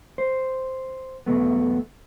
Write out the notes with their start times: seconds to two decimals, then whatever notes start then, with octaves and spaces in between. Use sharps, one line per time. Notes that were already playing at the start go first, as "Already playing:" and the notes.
0.18 C5
1.26 B1 E2 B2 A3 B3